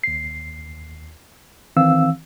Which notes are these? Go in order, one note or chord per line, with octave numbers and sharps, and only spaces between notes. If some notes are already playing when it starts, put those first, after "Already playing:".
D#2 C7
D#3 E3 C4 F5 E6